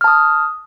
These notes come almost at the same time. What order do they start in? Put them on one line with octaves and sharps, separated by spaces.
F6 A5 D#6